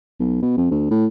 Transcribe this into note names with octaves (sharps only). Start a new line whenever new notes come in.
B1
B2
F2
D2
A2